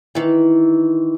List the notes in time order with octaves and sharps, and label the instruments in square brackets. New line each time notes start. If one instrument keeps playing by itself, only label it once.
[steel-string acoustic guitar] D#3 E3